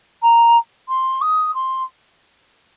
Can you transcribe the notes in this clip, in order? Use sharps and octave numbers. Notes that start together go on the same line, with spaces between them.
A#5
C6
D#6
C6